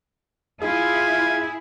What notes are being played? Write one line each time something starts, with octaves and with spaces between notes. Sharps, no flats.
E4 F4 G#4 G#5